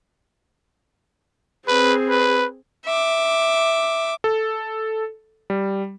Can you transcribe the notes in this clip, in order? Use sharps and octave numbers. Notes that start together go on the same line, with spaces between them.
C4 G#4 B4
B4
E5 D6
A4
G3